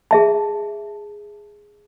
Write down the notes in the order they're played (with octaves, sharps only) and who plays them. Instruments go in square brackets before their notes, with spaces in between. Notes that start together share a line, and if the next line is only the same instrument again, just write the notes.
[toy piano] G#4 E5 A5